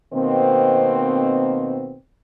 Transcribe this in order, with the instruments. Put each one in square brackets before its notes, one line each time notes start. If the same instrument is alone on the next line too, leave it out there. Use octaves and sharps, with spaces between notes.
[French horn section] B2 D#3 A#3 C4